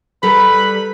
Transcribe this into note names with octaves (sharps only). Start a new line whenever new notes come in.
G3 A4 B4 A#5 B5